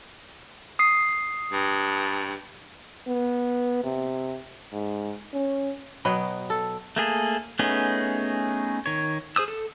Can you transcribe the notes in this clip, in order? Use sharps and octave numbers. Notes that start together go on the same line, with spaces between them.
D#6 C7
G2
B3
C3
G#2
C#4
B2 F#3 B3 G5
A4
A3 A#3 G#4 A4
A3 B3 C#4 D#4 G#4
D#3 C#5
G#4 C5 D#6 E6
A4